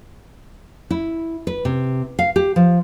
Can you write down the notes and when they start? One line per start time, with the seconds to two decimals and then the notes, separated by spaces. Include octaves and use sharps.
0.91 E4
1.47 B4
1.65 C3
2.19 F5
2.36 G4
2.56 F3